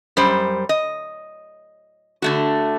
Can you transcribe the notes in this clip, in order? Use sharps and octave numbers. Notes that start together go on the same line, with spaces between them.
F#2 G3 C5
D#5
D3 A3 F#4